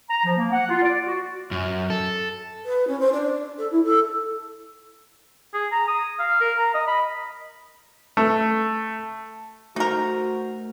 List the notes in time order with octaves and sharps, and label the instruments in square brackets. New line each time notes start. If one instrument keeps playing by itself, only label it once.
[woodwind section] A#5
F3
A#3
F#5
F4
D5
F#4
[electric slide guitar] F#2
A4
[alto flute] B4
C#4
C5
D4
A4
E4
A4
[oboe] G#4
A#5
D#6
F5
A#4
A#5
D#5
B5
[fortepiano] A3
[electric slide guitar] A3 C5 [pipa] D#4 A#4 [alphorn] F#4